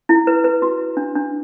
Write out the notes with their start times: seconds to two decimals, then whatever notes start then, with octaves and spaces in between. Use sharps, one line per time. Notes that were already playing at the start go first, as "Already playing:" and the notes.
0.09 E4
0.27 B4
0.44 B4
0.62 F#4
0.97 D4
1.15 D4